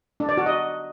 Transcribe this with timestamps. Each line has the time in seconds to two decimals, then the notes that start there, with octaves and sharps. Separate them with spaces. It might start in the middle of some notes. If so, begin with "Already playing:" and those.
0.20 D4
0.29 D5
0.37 F#4
0.46 D#5